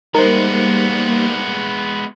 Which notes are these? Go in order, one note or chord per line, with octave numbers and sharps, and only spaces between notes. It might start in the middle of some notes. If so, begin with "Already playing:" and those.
G3 G#3 A#3 B3 D#4 A#4 C5